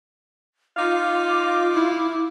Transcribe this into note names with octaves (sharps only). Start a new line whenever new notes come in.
D#4 F4 F5 D6
E4